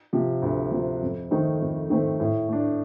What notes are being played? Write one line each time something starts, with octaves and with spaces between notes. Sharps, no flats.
C3 F3
D2
C3 F3
F2
D#3 A3 C4 D#4
F2
D#3 A3 C4 D#4
A2
A3 D4